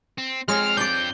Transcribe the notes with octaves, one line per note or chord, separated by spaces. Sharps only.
C4
F2 G#3 C4 C#5 F6
D4 D5 G6